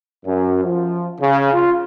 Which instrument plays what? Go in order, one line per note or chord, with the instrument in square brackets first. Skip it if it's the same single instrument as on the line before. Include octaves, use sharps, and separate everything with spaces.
[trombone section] F#2
F3
C#3
F4